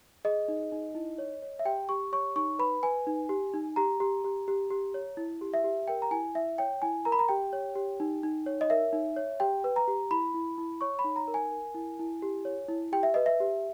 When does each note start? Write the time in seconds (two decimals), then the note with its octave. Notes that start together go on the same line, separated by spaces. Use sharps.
0.25 G#4 D#5
0.48 D#4
0.72 D#4
0.95 E4
1.18 C#5
1.42 C#5
1.59 E5
1.65 G4 G5
1.89 G4 C#6
2.12 C#5 C#6
2.36 D#4 C#6
2.59 B4 B5
2.83 B4 G#5
3.07 D#4
3.29 G4
3.54 D#4
3.76 G4 A#5
4.00 G4
4.24 G4
4.48 G4
4.70 G4
4.94 C#5
5.17 E4
5.41 G4
5.54 E5
5.64 G4
5.88 A#4 G5
6.02 A#5
6.11 E4 G#5
6.35 E4 E5
6.58 C#5 G5
6.82 E4 G#5
7.05 A#4 A#5
7.12 B5
7.19 A#5
7.29 G4 G5
7.53 C#5
7.75 G4
8.00 D#4
8.23 D#4
8.46 C#5
8.61 D#5
8.70 A#4 E5
8.93 D#4
9.16 C#5
9.40 G4 G5
9.64 B4
9.76 A#5
9.88 G4
10.11 E4 B5
10.34 E4
10.58 E4
10.81 C#5 C#6
10.99 B5
11.04 D#4
11.16 A#5
11.28 A#4
11.34 G#5
11.51 A#4
11.75 E4
11.99 E4
12.22 G4
12.45 C#5
12.69 E4
12.92 G4 G5
13.03 E5
13.14 B4 D#5
13.26 E5
13.40 G4